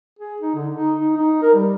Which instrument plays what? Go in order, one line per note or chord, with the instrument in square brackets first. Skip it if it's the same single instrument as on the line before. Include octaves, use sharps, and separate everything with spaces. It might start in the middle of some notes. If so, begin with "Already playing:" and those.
[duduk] G#4
D#4
D3
D#4
D#4
D#4
A#4
G3